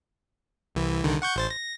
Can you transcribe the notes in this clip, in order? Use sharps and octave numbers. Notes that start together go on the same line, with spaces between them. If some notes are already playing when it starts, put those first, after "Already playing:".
C2 E3
C2 D3 D#3
F#5 C#6 G6
A1 C5 A6
A#6